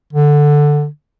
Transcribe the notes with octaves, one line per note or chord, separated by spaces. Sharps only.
D3